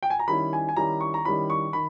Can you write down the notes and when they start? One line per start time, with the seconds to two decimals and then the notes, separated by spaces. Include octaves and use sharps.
0.03 G5
0.10 G#5
0.19 A#5
0.28 D#3 G3 C#4 E4 B5
0.53 G#5
0.69 G#5
0.76 D#3 G3 C#4 E4 A#5
1.01 C#6
1.14 A#5
1.25 D#3 G3 C#4 E4 B5
1.50 C#6
1.73 D#3 B5